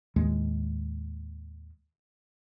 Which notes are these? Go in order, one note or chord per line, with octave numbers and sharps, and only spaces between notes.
D#2 A2 D#3 G#3